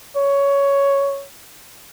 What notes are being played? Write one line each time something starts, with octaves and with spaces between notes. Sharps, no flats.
C#5